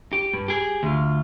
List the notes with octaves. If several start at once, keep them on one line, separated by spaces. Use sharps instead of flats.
G4
G2
G4 G#4
D2 F4